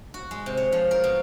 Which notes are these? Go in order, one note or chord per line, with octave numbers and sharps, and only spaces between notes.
F#4
G#3
C3
C#5
F3
A#4
B2